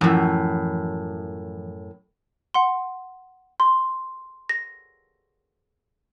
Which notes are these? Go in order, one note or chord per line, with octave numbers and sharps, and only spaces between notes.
F#2 A2 E3 F3
F#5 C6
C6
A#6